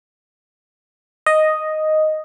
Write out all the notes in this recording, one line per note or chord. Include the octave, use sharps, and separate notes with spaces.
D#5